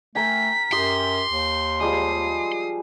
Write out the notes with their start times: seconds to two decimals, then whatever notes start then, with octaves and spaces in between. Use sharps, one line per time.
0.15 A3 A#4 G5 G#5 B6
0.72 F#2 G4 C6 D#6 E6
1.30 D#2
1.81 F3 G3 G#3 D#6 C7